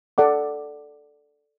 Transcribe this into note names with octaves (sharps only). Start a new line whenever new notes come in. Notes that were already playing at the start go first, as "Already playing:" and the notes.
A4 D5 F#5 D6